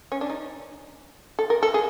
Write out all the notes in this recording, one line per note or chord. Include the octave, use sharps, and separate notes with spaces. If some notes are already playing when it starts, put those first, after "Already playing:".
C#4
D4
D#4
A4
A#4
A4
G#4